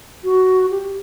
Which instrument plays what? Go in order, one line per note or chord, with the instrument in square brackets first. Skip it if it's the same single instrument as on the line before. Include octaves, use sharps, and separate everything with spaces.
[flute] F#4
G4